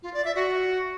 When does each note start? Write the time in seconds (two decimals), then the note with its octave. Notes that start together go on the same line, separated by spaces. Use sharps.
0.03 F4
0.14 D5
0.25 E5
0.35 F#4